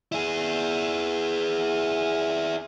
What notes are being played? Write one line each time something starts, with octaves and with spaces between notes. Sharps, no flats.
E4 G#4